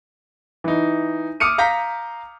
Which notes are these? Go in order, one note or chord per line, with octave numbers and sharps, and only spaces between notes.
E3 D#4
D6 D#6 F6 C#7 D#7
F5 A#5 G6 B6